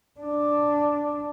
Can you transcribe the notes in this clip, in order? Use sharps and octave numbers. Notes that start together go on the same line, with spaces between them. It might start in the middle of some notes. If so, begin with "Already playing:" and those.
D4